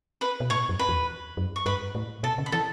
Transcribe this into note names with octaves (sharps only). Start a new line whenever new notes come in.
B4 B5
B2
A2 C#5 C#6
F#2
B4 B5
E2
F#2
C#6
G2 B4 B5
A2
B2 A4 A5
C#3
B5
E3 A4 A5